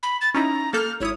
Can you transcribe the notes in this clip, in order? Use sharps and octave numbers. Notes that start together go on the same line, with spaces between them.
B5
A6
C#4 D#4 E4 A#5
A#3 A4 F6 G6
G#1 E4 C#5 D#6